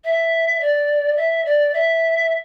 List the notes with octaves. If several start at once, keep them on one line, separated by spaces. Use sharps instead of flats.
E5
D5
E5
D5
E5